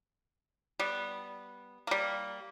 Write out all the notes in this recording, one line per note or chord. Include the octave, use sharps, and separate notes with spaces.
G3 B3
G3 A#3